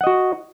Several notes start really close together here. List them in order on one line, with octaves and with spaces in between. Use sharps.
F#5 D#5 F#4